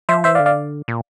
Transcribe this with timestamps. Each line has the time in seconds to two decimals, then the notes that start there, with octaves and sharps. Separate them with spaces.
0.09 F3 C5 E5
0.24 E3 C5 E5
0.35 D5 F5
0.39 D3
0.46 D5 F5
0.88 A#2